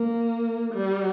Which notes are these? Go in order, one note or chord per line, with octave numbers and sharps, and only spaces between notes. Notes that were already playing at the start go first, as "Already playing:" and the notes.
Already playing: A#3
G3